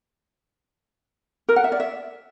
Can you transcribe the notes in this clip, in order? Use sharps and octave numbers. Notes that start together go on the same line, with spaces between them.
A#4
F#5
E5
D5
E5